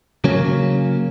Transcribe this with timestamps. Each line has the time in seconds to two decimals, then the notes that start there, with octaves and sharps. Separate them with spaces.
0.24 C#3 F#3 A#3 C#4